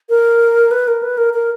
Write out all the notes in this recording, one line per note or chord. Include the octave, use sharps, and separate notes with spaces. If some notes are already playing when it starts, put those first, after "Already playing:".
A#4
B4
A#4
B4
A#4
A#4